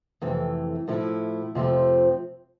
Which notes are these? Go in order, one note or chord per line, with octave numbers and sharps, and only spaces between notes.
F2 C3 E3 A3
A2 F3 A3 E4
F2 C3 F3 A3 C4